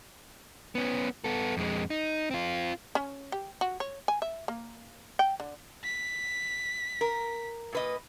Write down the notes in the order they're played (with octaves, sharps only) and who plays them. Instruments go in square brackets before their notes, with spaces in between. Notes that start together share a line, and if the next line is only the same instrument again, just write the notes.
[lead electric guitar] B3 C#4
B3 A4
F2 G#3
D#4
C4 F4
[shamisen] C#4
G4
F#4
C#5
G#5
E5
A#3
G5
D3
[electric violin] B6
[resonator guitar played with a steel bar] A#4
A#2 B4 D#5